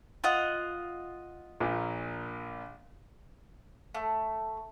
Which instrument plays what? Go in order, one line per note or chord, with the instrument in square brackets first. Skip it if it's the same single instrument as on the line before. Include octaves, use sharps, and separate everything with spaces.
[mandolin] F4 D#5 F#5
[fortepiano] A#1 A#2 F3
[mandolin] A3